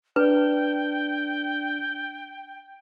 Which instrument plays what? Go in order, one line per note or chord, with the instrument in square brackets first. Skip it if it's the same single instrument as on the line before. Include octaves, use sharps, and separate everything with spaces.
[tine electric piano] D4 [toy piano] B4 [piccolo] G5